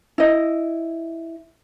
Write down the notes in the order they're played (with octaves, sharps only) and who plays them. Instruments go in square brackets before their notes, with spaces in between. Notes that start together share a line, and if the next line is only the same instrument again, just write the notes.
[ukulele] E4 D#5